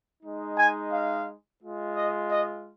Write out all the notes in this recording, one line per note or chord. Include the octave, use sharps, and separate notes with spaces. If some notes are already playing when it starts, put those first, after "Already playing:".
G#3 D#4
G#5
F5
G#3 F4
D#5
D#5